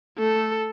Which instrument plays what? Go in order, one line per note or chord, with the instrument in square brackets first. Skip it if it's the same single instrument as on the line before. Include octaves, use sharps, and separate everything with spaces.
[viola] A3 [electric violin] A4